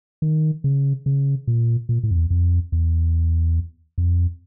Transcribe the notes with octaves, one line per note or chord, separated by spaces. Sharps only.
D#3
C#3
C#3
A#2
A#2
A2
F2
E2
F2
E2
F2